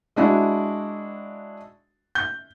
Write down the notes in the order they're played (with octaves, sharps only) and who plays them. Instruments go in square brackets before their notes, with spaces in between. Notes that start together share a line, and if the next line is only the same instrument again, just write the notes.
[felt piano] G#3 D4 E4 F#4
G6